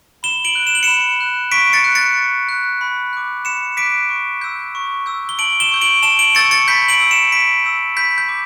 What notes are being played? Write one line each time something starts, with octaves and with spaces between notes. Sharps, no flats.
B5 E7 G7
D7 F#7
F#6
E7
F#7
B5 C#7 E7
F#6
C#6 B6 D7
A6 C#7
F#6
A6 C#7
C#6
F#6
B5
D6 F#6
B5 C#7 E7
D6 F#6 B6 D7
C#6
E6 G6
C#6
E6 G6
G7
A5 D7 F#7
E7 G7
C#6 E6 G6
D7 F#7
A5 E7 G7
D7 F#7
C#6 E6 G6 A6 C#7
A6 C#7
B5 G6 B6
D7 F#7
E6 G6
C#7 E7
B5 B6 D7
E6 G6
B5 G6 B6
G6
D6